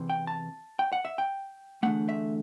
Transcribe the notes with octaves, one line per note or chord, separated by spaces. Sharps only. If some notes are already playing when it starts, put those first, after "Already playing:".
Already playing: E2 C3 E3
G5
A5
G5
F#5
E5
G5
E2 D3 A3 F#5
E5